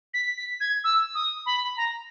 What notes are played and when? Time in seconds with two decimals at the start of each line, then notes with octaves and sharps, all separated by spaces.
0.14 B6
0.37 B6
0.60 G#6
0.84 E6
1.15 D#6
1.46 B5
1.77 A#5